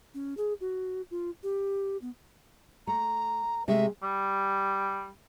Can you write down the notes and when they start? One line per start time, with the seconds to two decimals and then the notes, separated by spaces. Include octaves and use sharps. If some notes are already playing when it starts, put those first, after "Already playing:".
0.14 C#4
0.37 G#4
0.61 F#4
1.11 F4
1.43 G4
2.01 B3
2.87 A3 A#5
3.68 C3 G#3 A3 E5
4.03 G3